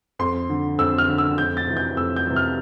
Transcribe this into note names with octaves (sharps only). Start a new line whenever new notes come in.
F2 C6
D3
F2 E6
F6
D3
E6
F2 G6
A6
C3 E3
G6
F2 E6
G6
C3 E3
F6